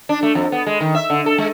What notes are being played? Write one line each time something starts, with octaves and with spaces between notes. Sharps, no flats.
D4
A3
F2
B3
G#3
D#3
E5
D3
A4
G#3